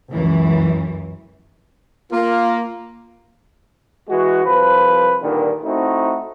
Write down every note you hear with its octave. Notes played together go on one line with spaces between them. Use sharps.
C#2 F#2 E3
A#3 F4
E3 G#3 F#4
C2 F3 B4
G2 A#2 D3 D#3
A3 C4 D#4 E4 F#4